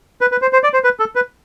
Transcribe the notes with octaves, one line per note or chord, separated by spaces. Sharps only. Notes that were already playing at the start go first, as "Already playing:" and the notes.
B4
B4
C5
C5
D5
C5
B4
A4
B4